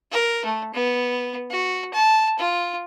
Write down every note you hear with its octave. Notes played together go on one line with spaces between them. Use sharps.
A#4
A3
B3
F#4
A5
F4